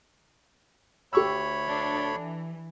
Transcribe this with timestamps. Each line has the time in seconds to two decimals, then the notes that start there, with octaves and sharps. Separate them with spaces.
1.13 D2 G4 C#5 B5 C#6 E6
1.67 D4 A4
2.11 E3